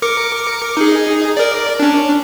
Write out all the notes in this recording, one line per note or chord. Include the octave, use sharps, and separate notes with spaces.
A#4 D6 C#7
D#4 G#4
A#4 D5
C#4 D4